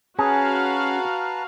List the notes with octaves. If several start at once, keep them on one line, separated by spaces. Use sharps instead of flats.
C#4 F#4 G#4 B4 F5 A5 A#5